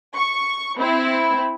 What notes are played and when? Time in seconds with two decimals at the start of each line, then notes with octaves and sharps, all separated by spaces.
0.16 C#6
0.77 C4 E4